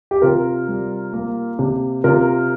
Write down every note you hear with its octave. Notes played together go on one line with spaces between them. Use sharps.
G4
C3 F4 A#4
G3
A#3
C3
C3 F4 A#4